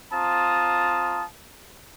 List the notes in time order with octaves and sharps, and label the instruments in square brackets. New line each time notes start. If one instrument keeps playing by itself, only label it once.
[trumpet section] C4 F4 A5 A#5 D#6